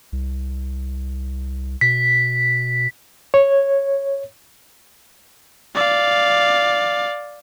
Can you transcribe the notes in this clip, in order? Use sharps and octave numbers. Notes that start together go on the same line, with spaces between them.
C2
B2 B6
C#5
D5 F5